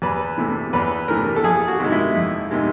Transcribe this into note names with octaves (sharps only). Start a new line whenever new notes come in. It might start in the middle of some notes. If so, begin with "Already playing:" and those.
E2 B4
C3 E3 A3
E2 B4
C3 E3 A3 A#4
A4
F2 G#4
F#4
C3 D#3 G#3
E4
F2
C3 D#3 G#3